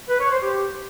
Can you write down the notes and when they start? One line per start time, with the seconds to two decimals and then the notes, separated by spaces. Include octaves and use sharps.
0.09 B4
0.20 C#5
0.31 C5
0.42 G4